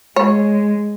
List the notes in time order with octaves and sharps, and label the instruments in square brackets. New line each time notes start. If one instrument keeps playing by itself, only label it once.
[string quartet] G#3 [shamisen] C#5